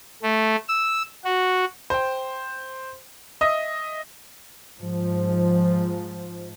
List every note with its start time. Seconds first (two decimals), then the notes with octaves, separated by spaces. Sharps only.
0.22 A3
0.68 E6
1.24 F#4
1.90 C5 G5
3.41 D#5 E5 D#6
4.77 G#2 F3